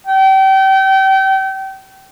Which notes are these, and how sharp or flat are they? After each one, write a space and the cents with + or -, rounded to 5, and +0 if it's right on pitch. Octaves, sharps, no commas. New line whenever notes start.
G5 -30